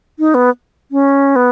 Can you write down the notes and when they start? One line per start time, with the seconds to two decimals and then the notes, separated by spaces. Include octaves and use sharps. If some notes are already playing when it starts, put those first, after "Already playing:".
0.19 D#4
0.34 B3
0.92 C#4
1.36 B3